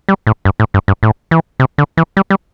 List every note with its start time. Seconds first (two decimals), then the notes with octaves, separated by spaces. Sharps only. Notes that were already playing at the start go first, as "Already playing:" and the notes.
0.09 G3
0.27 A2
0.45 G2
0.60 A2
0.74 G2
0.88 G2
1.03 A2
1.31 E3
1.60 C3
1.78 D3
1.97 E3
2.17 G3
2.30 G3